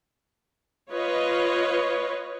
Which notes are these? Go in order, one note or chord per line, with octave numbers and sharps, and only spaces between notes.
F4 B4 C#5 D#5